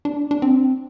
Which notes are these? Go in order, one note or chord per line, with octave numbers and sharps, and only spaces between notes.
D4
D4
C4